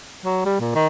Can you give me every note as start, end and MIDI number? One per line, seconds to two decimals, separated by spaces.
0.25 0.44 54
0.45 0.58 55
0.60 0.74 46
0.75 0.87 51